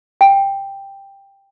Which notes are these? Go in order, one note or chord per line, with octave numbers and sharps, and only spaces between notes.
G5